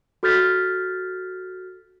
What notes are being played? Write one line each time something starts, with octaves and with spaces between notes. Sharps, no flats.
F#4 A4 F6 G6 A6 B6